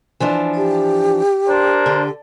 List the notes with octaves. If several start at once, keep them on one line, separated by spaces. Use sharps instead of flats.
E3 F3 D4
G4
D4 A#4 C5
D3